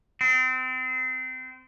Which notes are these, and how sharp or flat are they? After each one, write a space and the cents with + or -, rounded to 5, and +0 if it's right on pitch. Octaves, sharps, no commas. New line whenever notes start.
C4 -30